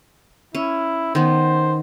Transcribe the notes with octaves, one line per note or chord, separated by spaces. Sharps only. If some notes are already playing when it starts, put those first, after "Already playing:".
C#4 E4
D#3 B3 C5